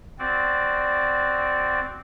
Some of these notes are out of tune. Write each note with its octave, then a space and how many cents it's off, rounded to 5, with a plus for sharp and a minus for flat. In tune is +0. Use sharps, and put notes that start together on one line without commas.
C4 -10 F#4 +0 D5 +0